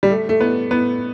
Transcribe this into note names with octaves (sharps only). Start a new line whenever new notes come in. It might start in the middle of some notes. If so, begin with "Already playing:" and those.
G3
A3
A3
B3
B3